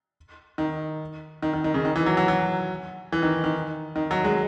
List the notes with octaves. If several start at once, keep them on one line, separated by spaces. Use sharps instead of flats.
D#3
D#3
D#3
D#3
C#3
D#3
E3
F#3
F#3
F#3
E3
D#3
D#3
D#3
F#3
G#3